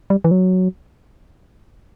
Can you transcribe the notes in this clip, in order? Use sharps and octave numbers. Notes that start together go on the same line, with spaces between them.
G3
E3
F#3